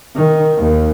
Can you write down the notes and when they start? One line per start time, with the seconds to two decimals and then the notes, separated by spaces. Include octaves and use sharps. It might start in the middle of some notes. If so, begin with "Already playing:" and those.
0.16 D#3
0.57 D#2